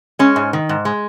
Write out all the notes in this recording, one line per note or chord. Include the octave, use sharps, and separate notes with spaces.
G#3 C#4
G#2
D#3
G#2
G#3